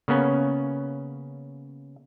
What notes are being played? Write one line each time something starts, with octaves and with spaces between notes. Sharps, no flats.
C#3 A#3 B3 C#4